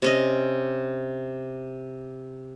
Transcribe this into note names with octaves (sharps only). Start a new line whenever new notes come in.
C3 C#4 D#5